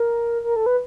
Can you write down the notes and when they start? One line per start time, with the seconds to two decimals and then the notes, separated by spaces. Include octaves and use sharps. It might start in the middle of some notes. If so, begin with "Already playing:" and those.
Already playing: A#4
0.44 A#4
0.56 A4
0.66 B4